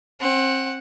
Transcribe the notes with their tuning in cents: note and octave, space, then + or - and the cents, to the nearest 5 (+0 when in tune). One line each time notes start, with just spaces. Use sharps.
C4 +30 F#5 +0